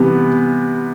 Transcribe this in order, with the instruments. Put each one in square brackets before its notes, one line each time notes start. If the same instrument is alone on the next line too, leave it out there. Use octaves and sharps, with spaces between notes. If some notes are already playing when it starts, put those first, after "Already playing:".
Already playing: [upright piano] C3 E3 G3 B3